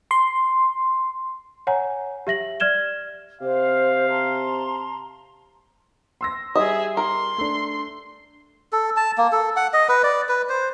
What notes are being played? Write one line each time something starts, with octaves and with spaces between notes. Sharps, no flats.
C6
C#5 F#5 G#5 A#5
G4 E5 A#6 F#7
D5 F6 G#6 E7 G7
C3 C5 F5
A5 A#5 C6
C6 E6 A#6
G3 G#4 D#5 E5
A#4 C6
A3 D4
A4
A5
A#3
A4
F#5
D#5
B4
D5
B4
C5